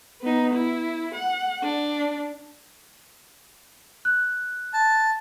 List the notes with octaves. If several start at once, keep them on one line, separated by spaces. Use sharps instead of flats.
B3 D#4
E4
F#5
D4
F#6
A5